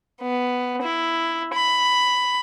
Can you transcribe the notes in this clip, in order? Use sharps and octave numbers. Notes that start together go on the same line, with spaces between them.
B3
E4
B5